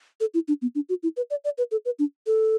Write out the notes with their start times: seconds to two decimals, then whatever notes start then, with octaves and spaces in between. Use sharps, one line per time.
0.20 A4
0.34 E4
0.48 D4
0.62 B3
0.75 D4
0.89 F#4
1.03 E4
1.17 B4
1.30 D5
1.44 D5
1.58 B4
1.71 A4
1.85 B4
1.99 D4
2.27 A4